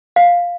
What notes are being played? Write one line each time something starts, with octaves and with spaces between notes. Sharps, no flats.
F5